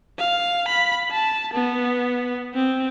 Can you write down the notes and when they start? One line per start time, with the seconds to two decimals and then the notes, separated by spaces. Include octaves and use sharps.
0.18 F5
0.68 B5
1.11 A5
1.54 B3
2.55 C4